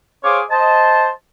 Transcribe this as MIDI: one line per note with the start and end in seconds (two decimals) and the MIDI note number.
0.24 0.41 68
0.24 0.41 72
0.24 0.41 73
0.24 0.41 77
0.24 0.41 86
0.50 1.09 72
0.50 1.09 75
0.50 1.09 81